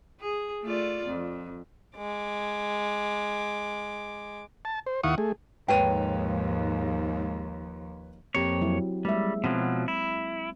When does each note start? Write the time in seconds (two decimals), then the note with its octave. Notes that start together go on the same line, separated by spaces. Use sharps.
0.21 G#4
0.63 A3 F4 D5
1.07 F2
1.97 G#3 D6
4.65 A5
4.86 C5
5.04 D#2 E4 F5 F#5 C#6 D#6
5.18 A3 G#4
5.68 D#2 G#2 F3 B4 C#5 G5 D#7
8.35 F2 A#3 C4 G4 C#5
8.61 F#3 E4
9.05 G3 G#3 A#3 E5
9.44 B2 F3 F#3 C4
9.88 E4